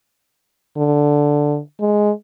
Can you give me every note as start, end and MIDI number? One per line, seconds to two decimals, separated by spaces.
0.77 1.60 50
1.81 2.11 56